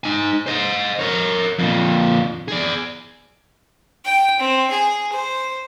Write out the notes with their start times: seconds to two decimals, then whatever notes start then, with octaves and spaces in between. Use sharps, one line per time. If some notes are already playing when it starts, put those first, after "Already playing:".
0.04 D#4 G#5
0.46 C5 D#5
0.99 A#4 C#5
1.59 F2 A#2
2.48 G#4 D5
4.05 G5
4.39 C4
4.71 G#4
5.12 C5